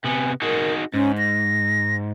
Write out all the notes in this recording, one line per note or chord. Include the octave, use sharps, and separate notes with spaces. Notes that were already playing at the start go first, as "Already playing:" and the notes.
C3 B3 G#5
D#4 F#4 G#4 A#4
G#2 C#4
A#6